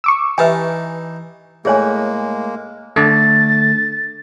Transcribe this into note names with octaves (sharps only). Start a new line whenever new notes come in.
C#6 D6 E6
E3 D#4 G4 B4 E5 G#5 A5
A2 G#3 A#3 G#4 C#5 G#5
D3 A3 A6